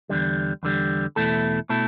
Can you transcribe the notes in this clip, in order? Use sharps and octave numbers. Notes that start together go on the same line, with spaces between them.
E2 D3 G3
E2 D3 G3
E2 B2 A3 E4 A4
B2 A3 E4 A4